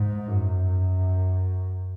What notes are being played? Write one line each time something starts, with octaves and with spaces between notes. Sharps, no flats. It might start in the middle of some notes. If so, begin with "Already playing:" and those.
Already playing: G#2
F#2